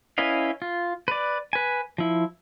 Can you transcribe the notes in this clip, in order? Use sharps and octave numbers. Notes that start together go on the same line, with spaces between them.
C#4 E4 B4 D#5 F5
F4
B4 D5
B4 G#5
F3 E4